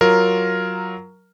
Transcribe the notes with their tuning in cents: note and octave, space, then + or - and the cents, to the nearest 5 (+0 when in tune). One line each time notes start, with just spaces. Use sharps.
F#3 +5 F4 +0 A#4 +0